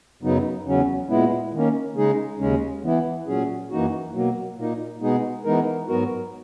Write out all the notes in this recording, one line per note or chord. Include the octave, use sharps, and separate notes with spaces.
F#2 C#3 F#3 B3 D#4
E2 C#3 F#3 C#4
A#2 G#3 B3 E4
D#3 A#3 C#4
C#3 G#3 D#4 G#4
D#2 C#3 G#3 C#4
E3 B3 E4
A#2 F#3 C#4 G#4
F#2 E3 A#3 D#4 F#4
B2 F#3 A#3
A#2 A#3 D#4
B2 G#3 B3 D#4 G#4
E3 G#3 B3 D#4 A#4
G#2 F#3 B3 F#4 A#4